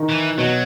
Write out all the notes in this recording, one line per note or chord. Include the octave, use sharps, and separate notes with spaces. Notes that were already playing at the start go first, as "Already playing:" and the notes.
Already playing: D#3
E3
B2 F#3